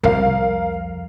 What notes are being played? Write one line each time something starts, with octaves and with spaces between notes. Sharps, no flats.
C2 F2 A#4 F5